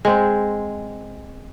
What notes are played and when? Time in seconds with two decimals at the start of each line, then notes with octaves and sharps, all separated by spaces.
0.05 G#3 C4 C5